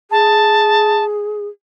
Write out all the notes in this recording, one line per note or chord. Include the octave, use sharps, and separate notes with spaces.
G#4 A5